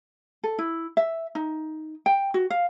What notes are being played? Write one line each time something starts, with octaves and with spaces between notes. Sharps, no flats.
A4
E4
E5
D#4
G5
F#4
F5